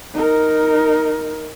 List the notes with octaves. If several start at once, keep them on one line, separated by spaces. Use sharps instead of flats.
D#4 A#4